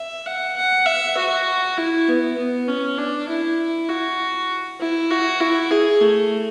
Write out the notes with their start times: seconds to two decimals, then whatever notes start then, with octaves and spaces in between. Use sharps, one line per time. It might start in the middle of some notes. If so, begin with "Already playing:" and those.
Already playing: E5
0.26 F#5
0.56 F#5
0.86 E5
1.17 F#4
1.78 E4
2.08 B3
2.37 B3
2.67 C#4
2.98 D4
3.29 E4
3.88 F#4
4.80 E4
5.10 F#4
5.40 E4
5.71 G#4
6.01 A3